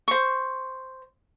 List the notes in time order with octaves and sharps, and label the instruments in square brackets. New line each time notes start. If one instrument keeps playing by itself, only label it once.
[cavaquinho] C5 C#6